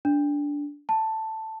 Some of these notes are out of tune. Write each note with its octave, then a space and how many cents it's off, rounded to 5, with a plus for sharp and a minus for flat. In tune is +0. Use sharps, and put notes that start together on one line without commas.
D4 -15
A5 +5